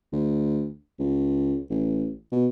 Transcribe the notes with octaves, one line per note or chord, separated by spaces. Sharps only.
D2
C#2
A1
B2